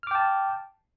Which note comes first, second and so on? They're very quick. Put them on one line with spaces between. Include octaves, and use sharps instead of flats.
F6 D6 G5 A5